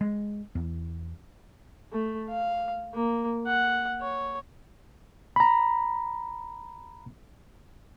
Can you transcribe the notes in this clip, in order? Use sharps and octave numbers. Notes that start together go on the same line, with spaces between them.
G#3
E2
A3
F5
A#3
F#5
C#5
A#5 B5